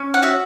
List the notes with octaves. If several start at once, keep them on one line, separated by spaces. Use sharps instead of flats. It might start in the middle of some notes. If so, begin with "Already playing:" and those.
Already playing: C#4
F#5
F#4 E5